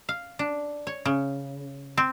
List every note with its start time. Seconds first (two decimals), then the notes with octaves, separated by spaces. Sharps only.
0.09 F5
0.39 D4
0.87 C#5
1.05 C#3
1.97 C4